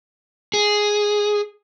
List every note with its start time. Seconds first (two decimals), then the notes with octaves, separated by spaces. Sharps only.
0.54 G#4